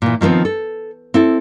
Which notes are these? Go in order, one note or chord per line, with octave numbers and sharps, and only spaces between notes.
A#2 E3
D#3 F3 A3 B3 C4
A4
C4 E4 A4